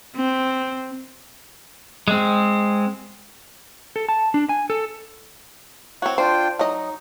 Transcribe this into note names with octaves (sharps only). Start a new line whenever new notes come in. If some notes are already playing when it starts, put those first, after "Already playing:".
C4
G#3 C4
A4
A5
D4
G#5
A4
C4 F#4 C#5
D4 F4 C5 G5
F#3 D#4 D#5